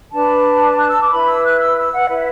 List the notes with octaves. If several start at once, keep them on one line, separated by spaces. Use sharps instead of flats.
D4 B4 A5
F#6
E6
D6
E4 B4 B5
E6
F#6
E6
E6
F#5
E4 B4 E5